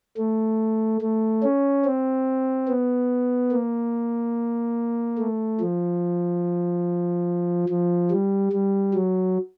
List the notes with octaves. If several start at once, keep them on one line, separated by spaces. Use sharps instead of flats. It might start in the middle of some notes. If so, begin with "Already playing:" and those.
A3
A3
C#4
C4
B3
A#3
A3
F3
F3
G3
G3
F#3